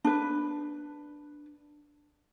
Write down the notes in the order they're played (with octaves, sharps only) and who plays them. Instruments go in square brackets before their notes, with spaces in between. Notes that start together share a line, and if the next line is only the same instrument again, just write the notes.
[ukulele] D4 B4